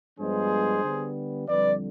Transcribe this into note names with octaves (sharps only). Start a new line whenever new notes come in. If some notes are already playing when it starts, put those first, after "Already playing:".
G2 F3 G#3 B3 D4 G#4 C5
D3 G3 B3
F2 D3 G3 B4 D5